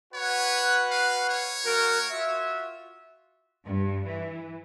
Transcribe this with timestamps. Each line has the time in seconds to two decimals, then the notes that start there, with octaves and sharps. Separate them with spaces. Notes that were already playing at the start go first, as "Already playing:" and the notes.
0.14 F#4 B4 C#5 F#5
0.90 F5
1.29 C#5
1.66 A#3 F#4 A#4
2.12 F4 F#4 E5
3.65 G2
4.07 E3